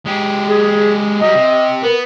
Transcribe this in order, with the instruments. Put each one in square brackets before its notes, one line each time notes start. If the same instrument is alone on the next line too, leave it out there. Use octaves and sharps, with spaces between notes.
[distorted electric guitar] G#3 G4
[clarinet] G#4
[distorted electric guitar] F#3 G3 [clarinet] D#5
[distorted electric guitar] C3
[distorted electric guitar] B3 [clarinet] A#4